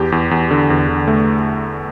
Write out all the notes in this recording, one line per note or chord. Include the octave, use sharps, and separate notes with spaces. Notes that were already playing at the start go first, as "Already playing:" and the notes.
Already playing: E2 G4
E2
E2
D3
E2
D3
A3